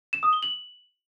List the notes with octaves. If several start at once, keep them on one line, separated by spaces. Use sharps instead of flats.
E7
D#6
G7
F#7